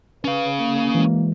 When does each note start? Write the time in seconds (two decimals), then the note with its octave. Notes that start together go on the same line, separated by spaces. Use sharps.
0.25 C#4 B4 F5
0.60 A#3
0.95 E3 G#3